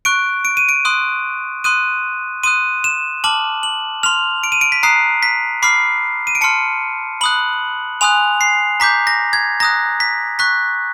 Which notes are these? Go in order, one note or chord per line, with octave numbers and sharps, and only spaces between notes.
C#6 F#6 D7
D7
D#7
D7
C6 D#6 F#6
C6 D#6 F#6 D#7
C6 D#6 F#6 D#7
E7
A5 D6 F6 F#7
F#7
C6 F6 F7
D7
D#7
D7
B6
A#5 D#6 F#6 C7
B6
B5 D6 F6 C7
D#7
D7
A5 C6 F6 C#7
B5 D#6 F#6 F#7
G#5 C6 D#6 F#6 F7
C7
A#5 D6 G6 B6
A#6
G#6
A#5 D#6 F#6 A#6
B6
C#6 F#6 B6